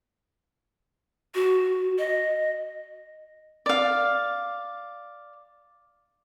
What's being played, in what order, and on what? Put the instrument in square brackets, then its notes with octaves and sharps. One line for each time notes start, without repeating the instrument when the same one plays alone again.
[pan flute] F#4
D#5
[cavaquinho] D5 F5